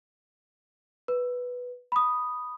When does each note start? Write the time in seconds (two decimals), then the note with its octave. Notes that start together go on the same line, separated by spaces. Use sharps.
1.08 B4
1.92 B5 D#6